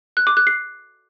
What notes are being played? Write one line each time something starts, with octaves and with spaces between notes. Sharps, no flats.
F#6
D6
F#6
C7